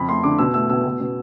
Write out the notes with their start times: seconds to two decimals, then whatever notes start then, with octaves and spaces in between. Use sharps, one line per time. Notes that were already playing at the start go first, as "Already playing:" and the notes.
Already playing: F2 B5
0.08 A3 C6
0.24 D3 D6
0.38 B2 E6
0.54 A3 E6
0.69 B2 E6
0.85 B2
1.00 B2